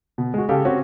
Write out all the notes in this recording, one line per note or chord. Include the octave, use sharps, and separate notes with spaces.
B2
G#3 F#4
C#3 G4 A4 F5
C4 C#4 F#4 G4